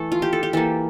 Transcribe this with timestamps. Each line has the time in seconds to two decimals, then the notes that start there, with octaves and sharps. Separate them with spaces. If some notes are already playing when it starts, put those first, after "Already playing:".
Already playing: E3 A3 A4
0.12 F4
0.22 G4
0.33 A4
0.43 G4
0.53 E3 A#3 A4